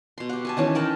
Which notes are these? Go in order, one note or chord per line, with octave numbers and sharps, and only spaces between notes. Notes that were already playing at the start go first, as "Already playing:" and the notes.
B2 C6
G4 F#5
B4 G#5 A5
D#3 E3 C#4 D#4
A#4 G5 A5 B5